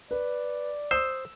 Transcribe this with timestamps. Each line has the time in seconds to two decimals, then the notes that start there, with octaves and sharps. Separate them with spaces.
0.11 B4 D5
0.91 C5 D#6 E6